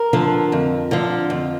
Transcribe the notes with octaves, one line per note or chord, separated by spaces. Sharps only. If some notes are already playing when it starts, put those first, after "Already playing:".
Already playing: A#4
D3 F3
F2
D3 F3
F2